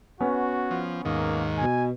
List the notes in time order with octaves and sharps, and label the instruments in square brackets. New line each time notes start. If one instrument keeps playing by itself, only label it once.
[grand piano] B3 C#4 [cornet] F#4
[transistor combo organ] F3
[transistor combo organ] D#2 G#2 D#3 [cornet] A#3
[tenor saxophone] B2 [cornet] G#5